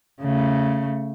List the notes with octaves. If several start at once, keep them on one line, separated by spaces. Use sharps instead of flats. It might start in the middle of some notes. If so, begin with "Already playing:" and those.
C#3 A3